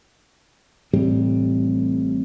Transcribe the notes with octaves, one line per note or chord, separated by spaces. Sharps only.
A1 A2 C3 G3